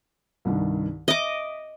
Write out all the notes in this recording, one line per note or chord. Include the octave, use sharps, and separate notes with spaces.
C2 G2 D#3
D#5 E5 D6